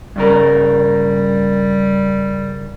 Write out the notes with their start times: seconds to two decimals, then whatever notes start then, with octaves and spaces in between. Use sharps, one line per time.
0.16 G2 C#3 G3 A#4